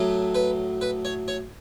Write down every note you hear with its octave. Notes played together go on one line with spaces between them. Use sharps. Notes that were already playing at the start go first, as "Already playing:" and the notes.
Already playing: A2 F#3 A3
B4
B4
C#5
C#5